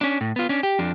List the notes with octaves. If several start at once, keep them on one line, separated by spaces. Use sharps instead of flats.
C#4 D4
A2
B3 F4
C#4 D4
G4
F2 D4